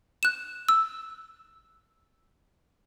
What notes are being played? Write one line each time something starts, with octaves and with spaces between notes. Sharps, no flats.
F#6 E7
E6